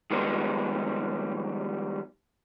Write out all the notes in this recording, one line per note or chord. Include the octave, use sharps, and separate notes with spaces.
D#3 F3 G3 G#3 B3